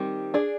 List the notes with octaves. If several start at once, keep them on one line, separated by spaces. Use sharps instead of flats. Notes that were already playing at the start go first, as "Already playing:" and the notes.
Already playing: D#3 G3 C4 G4
D4 G#4 D5